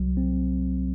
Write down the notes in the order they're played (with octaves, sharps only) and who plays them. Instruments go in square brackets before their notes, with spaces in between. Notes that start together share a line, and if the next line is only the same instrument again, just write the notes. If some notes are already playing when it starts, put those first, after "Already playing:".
Already playing: [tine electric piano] C2 F#3
C4